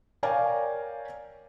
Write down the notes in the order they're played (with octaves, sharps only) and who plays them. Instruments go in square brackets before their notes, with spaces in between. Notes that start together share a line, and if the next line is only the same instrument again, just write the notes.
[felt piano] A#4 C#5 D5 F5 G5 G#5